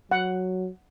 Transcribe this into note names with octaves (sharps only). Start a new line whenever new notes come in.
F#3 F#5